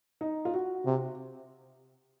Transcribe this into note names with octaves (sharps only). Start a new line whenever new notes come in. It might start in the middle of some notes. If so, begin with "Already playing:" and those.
D#4
F4
F#4
C3